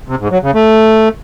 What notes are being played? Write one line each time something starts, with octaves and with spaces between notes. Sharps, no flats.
C3
G#2
F#3
C#3
A3